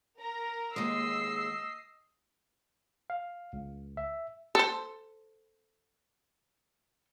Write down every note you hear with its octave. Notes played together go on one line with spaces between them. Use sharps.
A#4 A#5
D#2 G#3 D#5 E6 C7
F5
C#2
E5
A4 C5